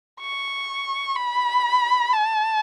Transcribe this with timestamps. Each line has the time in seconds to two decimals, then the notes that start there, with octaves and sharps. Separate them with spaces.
0.20 C#6
1.16 B5
2.12 A5